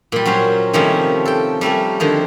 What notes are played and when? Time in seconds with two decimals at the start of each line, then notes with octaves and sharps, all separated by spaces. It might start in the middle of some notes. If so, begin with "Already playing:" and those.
0.12 A#2 G3
0.25 F#3 C#4 F#4 C5 A#5
0.73 C3 D#3 F3 G3 A3 C#4
1.25 A4 G5
1.61 G3 A3 C#4 A#4
2.00 D3 D#3 F3 G#4